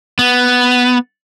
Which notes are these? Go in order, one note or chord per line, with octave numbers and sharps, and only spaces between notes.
B3